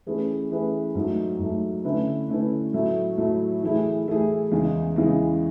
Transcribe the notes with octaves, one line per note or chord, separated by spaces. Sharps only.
E3 A3 C#4 G#4 B4
E3 A3 C#4 G#4 B4
G#2 F#3 A3
G#2 F#3 A3
D3 A3 C#4 E4 B4
D3 A3 C#4 E4 B4
A2 F#3 A3 E4
A2 F#3 A3 E4
E3 A3 E4 G#4
E3 A3 E4 G#4
E2 C#3 E3 G#3
E2 C#3 E3 G#3